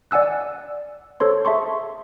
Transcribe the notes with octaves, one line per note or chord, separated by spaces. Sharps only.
D5 F#5 G#5 E6 F#6
A4 C5 C#5 C6
G#4 E5 A5 C6 C#6